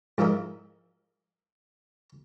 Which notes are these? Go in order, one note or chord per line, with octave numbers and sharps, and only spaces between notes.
G#2 F3 E4 A#4 D#5